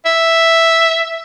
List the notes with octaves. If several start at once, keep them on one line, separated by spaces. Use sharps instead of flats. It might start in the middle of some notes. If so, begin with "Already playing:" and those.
E5